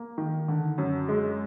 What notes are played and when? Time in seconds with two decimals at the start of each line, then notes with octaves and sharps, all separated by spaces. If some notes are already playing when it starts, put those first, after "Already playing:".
Already playing: A#3
0.18 D#3
0.48 D3
0.78 F#2
1.09 G#3